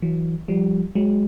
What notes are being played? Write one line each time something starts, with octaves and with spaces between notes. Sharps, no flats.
E3 F#3
F3 G3
F#3 G#3